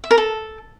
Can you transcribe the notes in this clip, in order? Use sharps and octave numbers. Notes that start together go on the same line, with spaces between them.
E5
A#4
A4